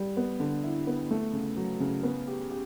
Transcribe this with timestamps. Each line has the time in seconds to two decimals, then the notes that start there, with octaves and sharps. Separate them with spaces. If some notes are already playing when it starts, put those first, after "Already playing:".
Already playing: G3
0.17 B3
0.40 D3
0.63 E4
0.87 B3
1.11 A3
1.33 C#3
1.57 F#3
1.80 C#3
2.03 B3
2.27 G4
2.50 G4